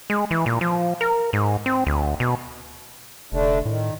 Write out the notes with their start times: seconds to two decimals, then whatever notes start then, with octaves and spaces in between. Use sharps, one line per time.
0.10 G#3
0.31 E3
0.46 A#2
0.61 F3
1.01 A#4
1.33 G#2
1.66 C4
1.87 D2
2.20 B2
3.32 F1 D3 A3 D4
3.65 A2 D#3